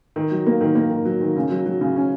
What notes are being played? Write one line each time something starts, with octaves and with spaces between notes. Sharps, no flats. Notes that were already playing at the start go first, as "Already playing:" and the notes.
D#3
F#3
A#3
D#3
A#3
D#3
F#3
D#3
C#3
F#3
F#3
C#3
C#4